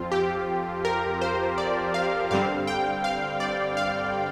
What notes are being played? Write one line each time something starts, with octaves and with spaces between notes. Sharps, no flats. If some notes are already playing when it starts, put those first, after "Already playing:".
Already playing: F2 F3 C4 F4
G4
A#4
C5
D5
F5
G2 D3 G3 C4 F5
G5
F5
D5
F5